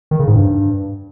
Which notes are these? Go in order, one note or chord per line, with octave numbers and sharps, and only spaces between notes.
D#3
C#3
G#2
G2